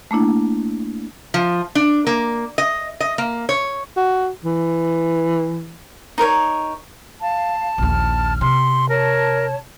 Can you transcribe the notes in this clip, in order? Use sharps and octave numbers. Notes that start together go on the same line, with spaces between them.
A3 A#3 D4 E4
F3
D4
A#3
D#5
D#5
A#3
C#5
F#4
E3
D#4 A#4 C5 C#5
F5 A5
A#1 D#2 F6
C3 C6
A#4 C#5 A5